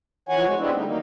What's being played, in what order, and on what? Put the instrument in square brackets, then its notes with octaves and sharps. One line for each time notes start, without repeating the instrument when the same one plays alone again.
[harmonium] F2 E3 C#5 F#5 G#5
G#3 F#4
G3 G#3 B3 C4 D4 E4
D3 G3 A3 D#4
D#3 F#3 A#3 D#4